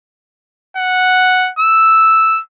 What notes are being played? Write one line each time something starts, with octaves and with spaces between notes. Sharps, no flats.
F#5
E6